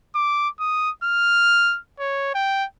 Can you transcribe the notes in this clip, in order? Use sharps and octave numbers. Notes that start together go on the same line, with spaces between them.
D6
D#6
F6
C#5
G5